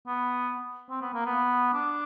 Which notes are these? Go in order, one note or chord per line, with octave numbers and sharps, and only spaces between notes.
B3
C4
B3
A#3
B3
D4